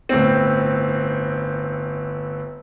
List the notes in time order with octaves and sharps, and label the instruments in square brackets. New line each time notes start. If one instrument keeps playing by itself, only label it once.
[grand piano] G1 A2 C4